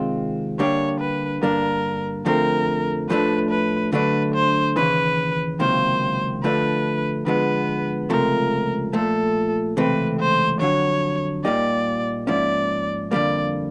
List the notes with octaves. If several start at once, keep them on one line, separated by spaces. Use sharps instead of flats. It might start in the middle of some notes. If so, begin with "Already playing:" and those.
Already playing: C3 D#3 G#3 C4 F4
D3 G3 A#3 D4 G4 C#5
B4
G2 D3 G3 A#3 D4 A#4
F2 D3 F3 A3 C4 A#4
A2 F3 A3 D4 B4
B4
D3 F#3 A3 D4 B4
C5
D#2 C#3 E3 B4
C#2 C3 D#3 F#3 A#3 C5
D3 F3 A3 D4 B4
D3 F3 G#3 B3 B4
C#2 C3 F3 A3 A#4
A#2 F3 A3 A4
C#2 C3 E3 A3 C4 B4
C5
F2 D3 F#3 C#5
A#2 G3 A#3 D#4 G4 D5
G#2 F3 A#3 C#4 E4 D5
F2 D3 G3 A#3 D5